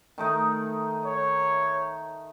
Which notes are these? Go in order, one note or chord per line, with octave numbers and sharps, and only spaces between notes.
D#3 A3 D#4
C#5